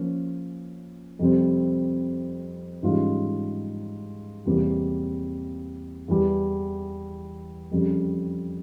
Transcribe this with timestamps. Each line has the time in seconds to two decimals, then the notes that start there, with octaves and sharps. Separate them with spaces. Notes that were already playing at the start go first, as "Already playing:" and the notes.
Already playing: F3 A#3 C#4
1.19 F2 C3 G3 C4
2.82 G#2 E3 G3 C#4 F4
4.45 E2 C3 G3 A#3
6.08 E2 E3 G3
7.71 F2 C#3 G3